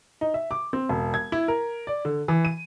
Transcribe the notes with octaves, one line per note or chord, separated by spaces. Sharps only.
D#4
E5
D6
C4
E1
G#6
E4
A#4
D5
D3
E3
D#7